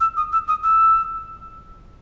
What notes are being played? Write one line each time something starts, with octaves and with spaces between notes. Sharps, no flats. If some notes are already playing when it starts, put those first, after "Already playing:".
E6
D#6
E6
D#6
E6